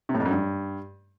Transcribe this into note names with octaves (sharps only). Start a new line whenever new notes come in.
C3
A2
F2
F#2
G2